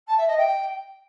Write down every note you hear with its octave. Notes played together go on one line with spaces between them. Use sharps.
A5
E5
D#5
G5